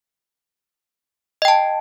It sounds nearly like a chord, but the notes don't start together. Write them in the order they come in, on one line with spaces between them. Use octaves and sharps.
D#5 G5 A5